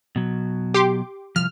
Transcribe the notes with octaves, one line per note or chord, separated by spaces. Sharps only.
B2 F#3
G4 C6 D6
C2 G2 F3 F6